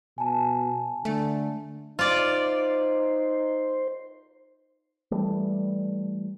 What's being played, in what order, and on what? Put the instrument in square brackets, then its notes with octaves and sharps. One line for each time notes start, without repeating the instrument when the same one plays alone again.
[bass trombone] B2 [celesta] G#5 A5
[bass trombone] D3 [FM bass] A3
[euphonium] D#4 [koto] F4 D5 [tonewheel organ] C5
[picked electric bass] E3 G3 A3